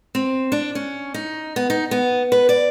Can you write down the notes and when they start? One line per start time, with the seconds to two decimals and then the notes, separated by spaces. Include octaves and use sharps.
0.15 C4
0.52 D4
0.75 C#4
1.14 D#4
1.56 B3
1.70 D#4
1.91 B3
2.32 B4
2.49 D5